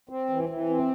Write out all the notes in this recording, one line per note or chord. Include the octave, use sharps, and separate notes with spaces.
C4
E3
E3
C4